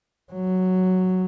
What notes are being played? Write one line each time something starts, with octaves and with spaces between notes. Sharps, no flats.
F#3